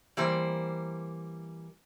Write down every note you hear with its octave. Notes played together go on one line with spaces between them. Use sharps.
E3 G3 A#3 C5